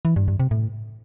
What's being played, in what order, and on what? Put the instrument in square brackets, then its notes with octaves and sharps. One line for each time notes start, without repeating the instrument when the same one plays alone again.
[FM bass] E3
G2
G2
C3
A2